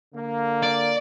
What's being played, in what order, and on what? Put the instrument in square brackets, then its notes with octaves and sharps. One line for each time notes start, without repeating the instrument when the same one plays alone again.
[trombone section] D3 A#3
[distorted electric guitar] D5